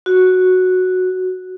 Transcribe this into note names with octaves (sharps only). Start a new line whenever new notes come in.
F#4